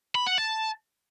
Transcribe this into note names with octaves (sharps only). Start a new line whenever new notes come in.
B5
F#5
A5